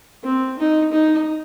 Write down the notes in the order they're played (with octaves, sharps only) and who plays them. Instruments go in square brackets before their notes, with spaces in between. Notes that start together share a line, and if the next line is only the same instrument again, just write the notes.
[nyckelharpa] C4
D#4
D#4